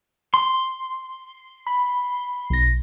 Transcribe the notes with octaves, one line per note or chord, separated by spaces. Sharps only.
C6
B5
B1 A#6